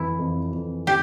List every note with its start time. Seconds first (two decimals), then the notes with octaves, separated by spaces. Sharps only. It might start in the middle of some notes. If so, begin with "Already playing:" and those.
Already playing: F2 E3 E4
0.19 F2
0.53 F2
0.87 G4